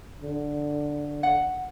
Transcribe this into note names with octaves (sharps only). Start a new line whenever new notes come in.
D3
F#5